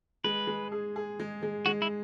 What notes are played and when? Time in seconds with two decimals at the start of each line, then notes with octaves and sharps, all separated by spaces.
0.24 G#3 B4
0.47 G#3
0.72 G#4
0.96 G#4
1.19 G#3
1.43 G#3
1.66 G#3 F#4
1.82 E4